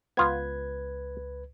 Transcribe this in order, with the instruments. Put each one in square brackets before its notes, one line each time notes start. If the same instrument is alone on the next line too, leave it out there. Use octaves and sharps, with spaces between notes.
[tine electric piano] C#2 B4 G#6 [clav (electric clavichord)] B3 F4